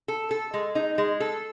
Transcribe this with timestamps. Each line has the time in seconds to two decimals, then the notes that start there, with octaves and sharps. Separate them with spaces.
0.08 A4
0.31 A4
0.54 G#3
0.75 D#4
0.98 G#3
1.20 A4